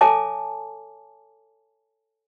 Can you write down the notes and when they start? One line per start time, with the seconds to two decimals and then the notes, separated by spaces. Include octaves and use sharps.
0.01 A4 C#5 E5 G#5 A5 D6